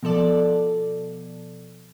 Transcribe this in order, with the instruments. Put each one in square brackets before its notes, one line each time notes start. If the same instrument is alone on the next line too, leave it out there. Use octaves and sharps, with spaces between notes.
[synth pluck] B2 F3 A4 D5